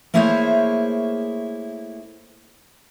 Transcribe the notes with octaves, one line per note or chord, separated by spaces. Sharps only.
A3 A#3 E4 G#4 C5 C#5